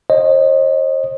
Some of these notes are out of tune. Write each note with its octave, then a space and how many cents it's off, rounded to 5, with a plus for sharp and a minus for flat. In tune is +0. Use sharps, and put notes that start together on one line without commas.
C5 +45 D#5 -10